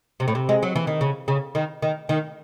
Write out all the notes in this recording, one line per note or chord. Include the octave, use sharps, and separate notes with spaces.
C3
A2
C3
G#3
F#3
E3
D#3
C#3
C#3
D#3
D#3
D#3